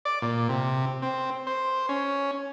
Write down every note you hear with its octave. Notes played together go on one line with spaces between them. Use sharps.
D5
A#2
C3
C4
C5
C#4